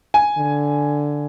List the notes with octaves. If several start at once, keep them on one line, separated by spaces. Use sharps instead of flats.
G#5
D3